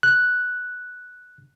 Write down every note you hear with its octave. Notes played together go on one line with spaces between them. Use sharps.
F#6